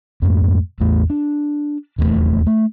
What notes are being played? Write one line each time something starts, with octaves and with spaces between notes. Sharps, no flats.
F2 G#2 A3
A1 E2 A3
D4
D#1 E2 F3 A3
A3